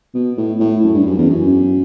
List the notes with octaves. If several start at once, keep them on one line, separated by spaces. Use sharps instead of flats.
B2
A2
A2
F#2
G2
F#2
E2
F#2